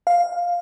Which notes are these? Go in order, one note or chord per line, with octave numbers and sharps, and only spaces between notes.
F5